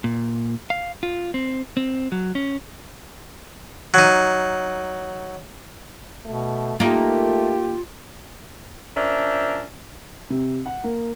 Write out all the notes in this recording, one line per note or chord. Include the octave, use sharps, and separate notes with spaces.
A#2
F5
F4
C4
C4
F#3
C#4
F#3 D#4
B2 A3
A3 A#3 D#4 F4 G4
F3 C#4 D4 A#4 C5 E5
C3
F#5
A#3